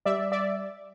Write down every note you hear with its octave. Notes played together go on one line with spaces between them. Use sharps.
G3 D5 E5
D5 E5